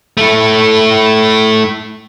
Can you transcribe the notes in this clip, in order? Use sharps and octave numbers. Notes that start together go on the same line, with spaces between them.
A3 E4